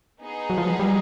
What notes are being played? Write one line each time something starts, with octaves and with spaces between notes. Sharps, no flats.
B3 D#4 G#4
F#3
F3
F#3
G3